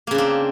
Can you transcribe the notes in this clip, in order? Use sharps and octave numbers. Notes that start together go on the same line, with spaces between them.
C#3 A#3 C4 D4